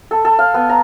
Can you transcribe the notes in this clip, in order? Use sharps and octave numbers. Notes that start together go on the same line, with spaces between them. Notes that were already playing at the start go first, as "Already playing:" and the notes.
A4
A4
F5
B3
A#5